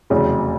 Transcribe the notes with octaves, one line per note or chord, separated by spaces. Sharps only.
F1 E2 C#3 F#3